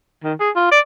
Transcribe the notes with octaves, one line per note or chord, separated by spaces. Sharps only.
D#3
G#4
F4
D5